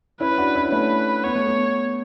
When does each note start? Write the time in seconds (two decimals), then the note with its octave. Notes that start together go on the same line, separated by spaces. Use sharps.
0.20 C#4 E4 B4
0.38 D4 F#4
0.55 C#4 E4
0.71 A3 C#4 B4
1.24 B3 C#5
1.35 A3
1.47 B3